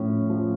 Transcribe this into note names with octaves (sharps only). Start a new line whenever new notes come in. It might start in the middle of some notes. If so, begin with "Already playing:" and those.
Already playing: A2 F3 C#4
F3